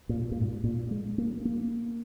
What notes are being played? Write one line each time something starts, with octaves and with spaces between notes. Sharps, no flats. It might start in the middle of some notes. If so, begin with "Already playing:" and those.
A#2
A#2
G#2
A#2
G#3
A#3
A#3